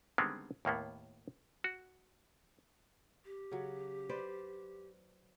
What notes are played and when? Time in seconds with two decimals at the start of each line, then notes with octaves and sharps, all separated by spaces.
0.18 D3 D#3 G3 G#3 B3 C4
0.65 D#2 A2 A#3 B3
1.64 F#4
3.24 G4
3.51 C#3 F#3
4.09 B4 C5 D5